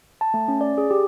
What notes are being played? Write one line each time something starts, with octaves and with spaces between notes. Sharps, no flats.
A5
A3
C#4
D5
G#4
G4